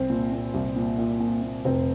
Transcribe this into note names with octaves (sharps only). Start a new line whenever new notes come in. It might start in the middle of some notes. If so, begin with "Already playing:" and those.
Already playing: C2 C4
A#2
A#2
C2
A#2
A#2
A#2
A#2
F1 C4